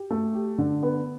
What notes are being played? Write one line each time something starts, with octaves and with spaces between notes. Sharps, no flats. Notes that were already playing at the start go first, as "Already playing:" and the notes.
Already playing: G4
A3
G4
D3
B3